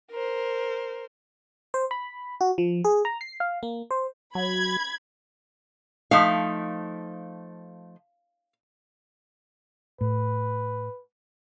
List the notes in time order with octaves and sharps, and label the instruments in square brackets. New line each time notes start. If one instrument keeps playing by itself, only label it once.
[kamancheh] A#4 C5
[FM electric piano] C5
B5
F#4
F3
G#4
A#5
C7
F5
A#3
C5
[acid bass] F#3 [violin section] B5 G#6
[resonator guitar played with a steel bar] F3 A3 D#4 [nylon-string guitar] F5
[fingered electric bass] A2 [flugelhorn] B4